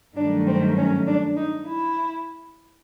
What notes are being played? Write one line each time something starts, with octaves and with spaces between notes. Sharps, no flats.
G2 D#3 F#3 A3 D4
C4
C#4
D4
D#4
E4